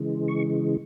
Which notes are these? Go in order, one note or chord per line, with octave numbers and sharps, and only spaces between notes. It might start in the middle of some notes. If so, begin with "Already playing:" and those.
Already playing: C#3 E3 G#3
C#6